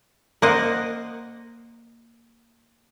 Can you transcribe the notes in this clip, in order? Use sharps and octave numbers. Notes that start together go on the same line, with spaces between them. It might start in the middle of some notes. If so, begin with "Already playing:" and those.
A#3 C5 D#5 F#5